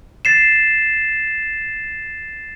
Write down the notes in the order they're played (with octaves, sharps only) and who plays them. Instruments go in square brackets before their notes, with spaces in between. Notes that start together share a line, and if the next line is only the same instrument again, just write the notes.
[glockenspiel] A6 C7 E7